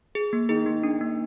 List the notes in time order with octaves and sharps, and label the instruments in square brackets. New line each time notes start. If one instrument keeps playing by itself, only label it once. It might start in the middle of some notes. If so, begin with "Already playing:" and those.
[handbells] G#4
A#3
[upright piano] D#3 D#4 [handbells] G#4
[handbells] A#3
D4
A#3